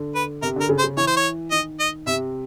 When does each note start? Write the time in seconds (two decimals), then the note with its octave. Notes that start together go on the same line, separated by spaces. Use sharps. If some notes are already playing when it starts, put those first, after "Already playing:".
Already playing: D3
0.15 B4
0.42 C3 A#4
0.56 D3 A#4
0.69 C#3
0.78 C5
0.84 C#3
0.97 E3 C#5
1.07 C5
1.17 C#5
1.51 D#3 D#5
1.80 D#5
2.07 C3 E5